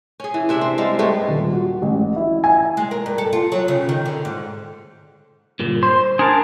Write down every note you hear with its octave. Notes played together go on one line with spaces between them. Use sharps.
C#4 G#4
E3
C3 D4 E5
C4
G3 G#3 F5
G2 G#3 A3 B3
D#1
F#4
A1
E4
G#5
G#3
A#4
G2
A4
F4
F#3
C#3
D#3
D3
G#2
G2 A#2 D3
C5 C6
D4 G#4 A#4 A5